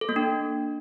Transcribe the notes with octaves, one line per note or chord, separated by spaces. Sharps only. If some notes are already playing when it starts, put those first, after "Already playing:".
A4
A#3
D4